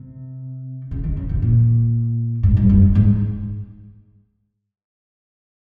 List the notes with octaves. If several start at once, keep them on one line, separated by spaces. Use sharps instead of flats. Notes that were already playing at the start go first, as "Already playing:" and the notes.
Already playing: C3
C#3
D#3
C#3
C3
A#2
G#2
G2
G2
G#2
G#2